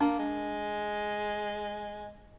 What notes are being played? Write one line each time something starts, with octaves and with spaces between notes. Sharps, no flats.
A#3 D4
G#3